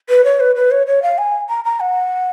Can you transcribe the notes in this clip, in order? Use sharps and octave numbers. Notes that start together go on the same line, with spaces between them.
B4
C#5
B4
B4
C#5
C#5
F5
G#5
A#5
A#5
F#5